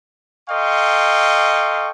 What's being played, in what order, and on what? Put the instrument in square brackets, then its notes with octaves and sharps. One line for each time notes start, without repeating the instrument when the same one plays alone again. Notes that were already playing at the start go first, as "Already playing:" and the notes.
[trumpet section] A4 D#5 F5 G5 C6 C#6